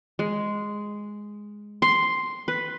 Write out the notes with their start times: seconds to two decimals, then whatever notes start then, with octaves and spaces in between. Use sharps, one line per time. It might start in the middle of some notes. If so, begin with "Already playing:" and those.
0.19 G#3
1.82 C6
2.48 B4